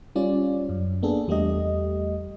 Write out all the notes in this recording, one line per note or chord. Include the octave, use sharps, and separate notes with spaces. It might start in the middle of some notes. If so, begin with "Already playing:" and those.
G3 C#4 F4 D5
F#2
A#3 B3 D4 G#4 A4
E2 G3 A3 G4 D#5